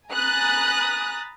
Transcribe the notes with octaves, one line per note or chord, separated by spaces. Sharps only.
G#5 A#5 B5 D#6 F#6 A6